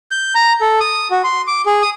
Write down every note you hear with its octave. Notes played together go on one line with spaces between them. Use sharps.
G6
A#5
A4
D#6
F#4
C6
D6
G#4
D#6